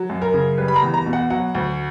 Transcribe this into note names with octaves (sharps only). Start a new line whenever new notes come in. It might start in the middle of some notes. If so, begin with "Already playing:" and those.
Already playing: F#3
F#2
A#4
C#3
G3 B4
B5
A#5
E2
A#5
B2
F#5
F#3 F#5
D2